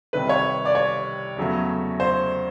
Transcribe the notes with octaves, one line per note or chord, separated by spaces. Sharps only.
C2 C3 D#3 B4
C#5
D5
C#5
E2 C#3 F#3 A3
C5